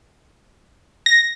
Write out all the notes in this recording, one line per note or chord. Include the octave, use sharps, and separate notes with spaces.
A#6